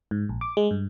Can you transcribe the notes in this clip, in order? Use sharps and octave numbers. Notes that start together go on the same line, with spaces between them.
G#2
A#1
D6
G#3
G2